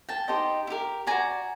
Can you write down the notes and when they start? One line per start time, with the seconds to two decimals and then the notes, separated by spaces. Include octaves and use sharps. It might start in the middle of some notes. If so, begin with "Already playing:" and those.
0.09 G5 A5
0.28 D#4 G4 C5 D#5
0.67 E4
0.70 G4 A#4
1.07 B4 D5 G#5 A#5
1.11 F#4